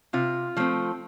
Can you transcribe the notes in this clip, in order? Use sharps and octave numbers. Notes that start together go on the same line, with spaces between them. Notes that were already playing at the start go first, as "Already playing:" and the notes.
C3 F4
F3 A3 C4